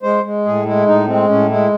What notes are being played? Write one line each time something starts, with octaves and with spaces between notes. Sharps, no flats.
G#3 C5
G#3
A2 G#4
G#3 E4
A2 D#4
G#3 C4
A2 C#4
G#3 E4